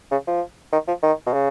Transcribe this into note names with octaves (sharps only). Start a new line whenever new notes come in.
C#3
F3
D#3
F3
D#3
B2
C#3